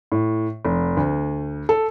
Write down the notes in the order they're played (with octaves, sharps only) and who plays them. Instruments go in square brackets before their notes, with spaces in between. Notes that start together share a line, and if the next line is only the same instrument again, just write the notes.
[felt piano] A2
F1
D2
A4